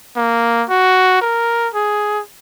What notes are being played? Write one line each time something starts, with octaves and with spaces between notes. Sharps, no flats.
A#3
F#4
A#4
G#4